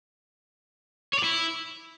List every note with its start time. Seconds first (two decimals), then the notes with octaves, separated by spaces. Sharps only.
1.13 C#5
1.19 D5
1.24 E4